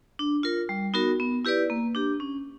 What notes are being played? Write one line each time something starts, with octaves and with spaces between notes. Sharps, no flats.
D4
F4 A#4
G3
B3 D#4 F#4 A#4
B3
E4 G4 B4 D5
A#3
D4 G4
C#4